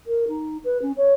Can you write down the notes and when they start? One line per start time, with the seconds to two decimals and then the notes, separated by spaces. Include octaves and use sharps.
0.07 A#4
0.28 D#4
0.64 B4
0.82 C#4
0.97 C#5